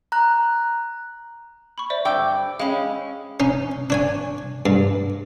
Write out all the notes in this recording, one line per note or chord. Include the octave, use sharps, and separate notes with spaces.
A#5 F#6
B5 C#6
C5 D5 E5
G2 G5 D6 E6
G#3 C#4 F5 B5
C#4 D#4
D4 C#5 G#5
G2